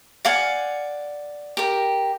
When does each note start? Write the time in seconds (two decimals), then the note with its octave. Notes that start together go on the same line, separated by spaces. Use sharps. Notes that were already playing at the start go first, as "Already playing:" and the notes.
0.25 D5 F5 F#5 G#5
1.57 G4 A#4